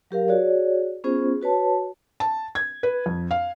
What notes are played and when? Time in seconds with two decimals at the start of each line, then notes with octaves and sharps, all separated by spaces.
0.11 F#3 G4 A#4 F5
0.28 F#4 G#4 C#5 D5
1.04 B3 C#4 F4 G#4 C5
1.42 F#4 B4 C#5 A5
2.20 A5
2.55 G#6
2.83 B4
3.06 F2
3.31 F5